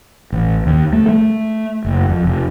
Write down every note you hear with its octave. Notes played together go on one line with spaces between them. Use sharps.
A1
D#2
A3
A3
F#1
F2
F1